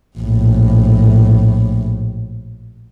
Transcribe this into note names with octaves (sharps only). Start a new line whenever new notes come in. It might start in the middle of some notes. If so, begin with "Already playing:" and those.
A#1 A2